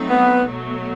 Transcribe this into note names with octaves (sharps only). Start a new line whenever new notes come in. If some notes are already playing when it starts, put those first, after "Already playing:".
Already playing: F#3 A3 C4 D#4
B3
B2 F#3 A3